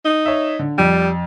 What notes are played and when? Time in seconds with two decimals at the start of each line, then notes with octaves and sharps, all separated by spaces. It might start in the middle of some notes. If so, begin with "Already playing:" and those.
0.05 D#4
0.25 C#5 E5
0.59 D3
0.78 F2 G3